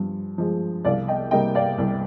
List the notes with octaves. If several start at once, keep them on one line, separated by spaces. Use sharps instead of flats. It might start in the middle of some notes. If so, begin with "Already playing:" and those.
Already playing: G2 F3
F3 G#3
C2 D5 F5
D#5 G5
C3 G3 A#3 D#5 G5
D5 F5
C2